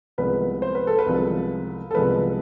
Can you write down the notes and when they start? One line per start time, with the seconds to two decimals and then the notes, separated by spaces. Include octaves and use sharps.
0.18 C2 C3 F3 G#3 B3 B4
0.62 C5
0.75 B4
0.87 A4
0.99 B4
1.06 C2 C3 F3 G#3 B3
1.91 A4
1.95 C2 C3 F3 G#3 B3 B4